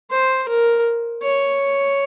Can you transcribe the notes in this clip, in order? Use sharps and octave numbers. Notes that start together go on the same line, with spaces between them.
C5
A#4
C#5